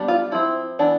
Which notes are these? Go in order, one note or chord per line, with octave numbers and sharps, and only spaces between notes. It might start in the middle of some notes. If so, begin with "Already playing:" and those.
Already playing: G3 B3 D4
F4
F3 C4 E4
E3 B3 D4